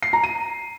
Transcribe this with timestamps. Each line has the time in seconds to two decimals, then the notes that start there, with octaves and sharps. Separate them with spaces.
0.03 C7
0.13 A#5
0.23 D#7